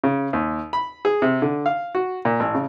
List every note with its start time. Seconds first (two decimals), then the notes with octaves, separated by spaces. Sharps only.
0.04 C#3
0.33 D#2
0.73 B5
1.05 G#4
1.22 C3
1.42 D3
1.66 F5
1.95 F#4
2.25 A#2
2.40 A1
2.54 C#3